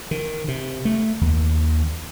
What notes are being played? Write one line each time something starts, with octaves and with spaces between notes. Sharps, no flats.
D#3
C3
A3
D#2